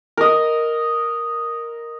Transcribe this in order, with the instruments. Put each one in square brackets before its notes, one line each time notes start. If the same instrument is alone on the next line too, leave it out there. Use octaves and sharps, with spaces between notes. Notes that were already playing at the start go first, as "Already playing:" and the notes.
[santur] A#4 D#5